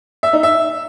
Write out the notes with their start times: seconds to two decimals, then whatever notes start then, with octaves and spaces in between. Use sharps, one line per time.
0.23 E5
0.33 D#4
0.43 E5